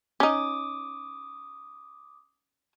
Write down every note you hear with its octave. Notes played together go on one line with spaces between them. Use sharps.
C#4 D#4 D6 D#6